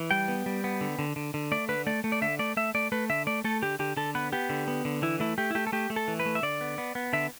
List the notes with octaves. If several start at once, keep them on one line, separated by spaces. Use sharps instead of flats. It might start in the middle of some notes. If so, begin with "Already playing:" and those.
Already playing: E3
G3 G5
B3
G3
B3
D3
D3
D3
D3
A3 D5
D3 B4
A3 D5
A3
D5
D3 E5
A3 D5
A3 E5
A3 D5
A3 B4
D3 E5
A3 D5
A3 A4
D3 G4
D3 G4
D3 A4
B3 B4
B3 G4
D3
B3
D3
E3 E4
A3 E4
A3 G4
E4
A3 G4
A4
A3 G4
A3
A4
E3
B4
A3
E5
D3 D5
B3
B3
B3
D3 E5